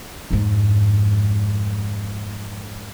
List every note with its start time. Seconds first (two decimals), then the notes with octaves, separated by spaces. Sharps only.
0.31 F2 G#2